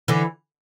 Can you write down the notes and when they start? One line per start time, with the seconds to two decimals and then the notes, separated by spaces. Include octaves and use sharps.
0.08 D3 E3